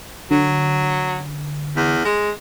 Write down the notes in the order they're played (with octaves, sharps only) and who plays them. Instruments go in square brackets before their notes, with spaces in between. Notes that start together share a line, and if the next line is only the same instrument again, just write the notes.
[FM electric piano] D3 [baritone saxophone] F#3
[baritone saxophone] E2
G#3